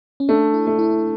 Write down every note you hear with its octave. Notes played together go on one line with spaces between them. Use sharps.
C#4
A3 D4
E4
A3
E4